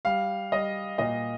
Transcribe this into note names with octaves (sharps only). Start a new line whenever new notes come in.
G3 F5
G3 D#5
A#2 D#5